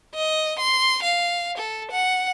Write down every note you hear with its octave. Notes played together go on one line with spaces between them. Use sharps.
D#5
C6
F5
A4
F#5